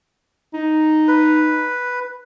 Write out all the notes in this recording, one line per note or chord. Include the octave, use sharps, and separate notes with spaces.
D#4
B4